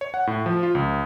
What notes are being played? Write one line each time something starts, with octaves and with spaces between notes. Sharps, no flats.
C#5
F#5
A2
F3
F4
C#2